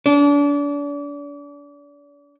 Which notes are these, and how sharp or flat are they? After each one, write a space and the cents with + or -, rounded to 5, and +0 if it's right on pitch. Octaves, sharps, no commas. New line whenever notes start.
D4 -35